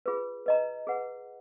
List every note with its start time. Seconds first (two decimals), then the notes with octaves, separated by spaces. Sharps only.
0.06 F4 G#4 B4
0.46 B4 D#5 A#5
0.87 G#4 B4 F#5